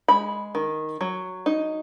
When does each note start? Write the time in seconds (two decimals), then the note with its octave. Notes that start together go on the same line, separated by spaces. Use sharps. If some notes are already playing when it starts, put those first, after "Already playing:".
0.08 G#3 B5
0.55 D#3
1.01 F#3
1.46 D#4